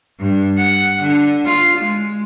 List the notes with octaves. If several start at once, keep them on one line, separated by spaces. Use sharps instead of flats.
G2
F#5
D3
F4
G#3